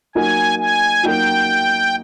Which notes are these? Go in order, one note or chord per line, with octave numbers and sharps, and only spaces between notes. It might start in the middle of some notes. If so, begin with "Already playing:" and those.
F#3 A#3 D#4 F#4 A#4 G#5
G#5
F#3 A#3 D#4 F#4 A#4 G5